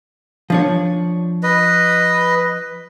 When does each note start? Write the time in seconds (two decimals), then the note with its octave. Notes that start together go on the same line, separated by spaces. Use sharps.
0.50 F3 D4 C#5
1.43 B4 D#5